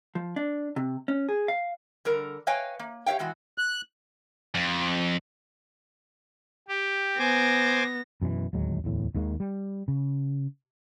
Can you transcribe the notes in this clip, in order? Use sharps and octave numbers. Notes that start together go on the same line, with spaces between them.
F3
D4
C3
C#4
G#4
F5
D3 G3 A#4
B4 C#5 D#5 F5 G5 G#5
A#3
G4 C#5 E5 F5 G5
B2 E3 G#3 F#4
F#6
F2
G4
B3 C5 G#5 D6 A#6
F#2 B2 D#3 E3
D1 D#2 F#3 G#3
D1 E2 A2
D#2 D#3 G#3 A#3
G3
C#3